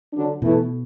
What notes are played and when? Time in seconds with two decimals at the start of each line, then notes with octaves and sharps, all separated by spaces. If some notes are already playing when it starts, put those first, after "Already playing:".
0.13 D3 F#3 D4
0.42 B2 E3 A3 E4